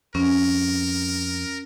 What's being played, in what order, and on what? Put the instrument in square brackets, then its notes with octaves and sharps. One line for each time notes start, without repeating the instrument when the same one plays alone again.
[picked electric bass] F2 [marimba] C#4 [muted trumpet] A#4